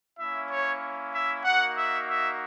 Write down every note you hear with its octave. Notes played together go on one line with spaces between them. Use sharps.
A#3 C#4 E4 E5
C#5
E5
A#3 D#4 F#4 F#5
E5
E5